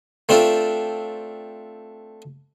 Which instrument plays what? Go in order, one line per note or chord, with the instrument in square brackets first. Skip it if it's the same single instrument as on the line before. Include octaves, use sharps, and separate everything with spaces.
[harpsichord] A3 C4 D4 F4